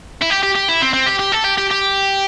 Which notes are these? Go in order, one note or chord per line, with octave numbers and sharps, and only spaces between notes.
E4
G4
G4
G4
E4
C4
C4
G4
G4
A4
G4
G4
G4